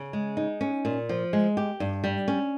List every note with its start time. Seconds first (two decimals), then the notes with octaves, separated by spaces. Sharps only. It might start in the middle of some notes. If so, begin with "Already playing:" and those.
Already playing: C#3
0.13 G#3
0.37 D#4
0.61 C#4
0.85 A#2
1.09 F3
1.33 G#3
1.57 G4
1.80 G2
2.04 G3
2.28 C#4